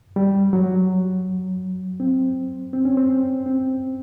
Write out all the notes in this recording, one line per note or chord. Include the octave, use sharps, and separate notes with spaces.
G3
F#3
C4
C4
C#4
C4
C4